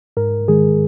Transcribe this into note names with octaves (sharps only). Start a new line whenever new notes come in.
G#2 A#4
D#3 G#3 G#4